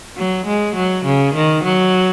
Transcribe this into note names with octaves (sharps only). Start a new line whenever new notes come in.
F#3
G#3
F#3
C#3
D#3
F#3